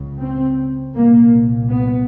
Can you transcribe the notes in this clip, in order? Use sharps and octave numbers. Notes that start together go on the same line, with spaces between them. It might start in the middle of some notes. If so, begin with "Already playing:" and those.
Already playing: C#2 C#3
C4
C2 A#2 A#3
B3